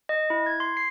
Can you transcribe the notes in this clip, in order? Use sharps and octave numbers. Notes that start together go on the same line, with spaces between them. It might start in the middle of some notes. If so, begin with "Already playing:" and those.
D#5
E4
G#6
C6
C7